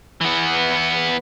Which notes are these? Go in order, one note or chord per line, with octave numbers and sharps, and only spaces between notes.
E3 B3